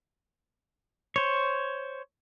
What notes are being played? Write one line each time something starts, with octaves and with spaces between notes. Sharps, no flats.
C5 C#5